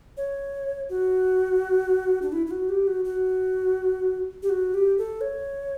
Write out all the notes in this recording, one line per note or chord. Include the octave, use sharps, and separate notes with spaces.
C#5
F#4
D4
E4
E4
F#4
G4
F#4
F#4
G4
F#4
G4
A4
C#5